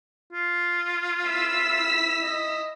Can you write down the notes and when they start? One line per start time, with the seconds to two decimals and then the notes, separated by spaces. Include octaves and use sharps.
0.32 F4
1.27 E4 E6 B6
2.22 D#5